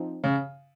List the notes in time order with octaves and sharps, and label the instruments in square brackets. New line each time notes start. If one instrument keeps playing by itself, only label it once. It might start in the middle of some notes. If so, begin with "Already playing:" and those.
Already playing: [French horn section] F3 C4 D#4
[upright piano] C#3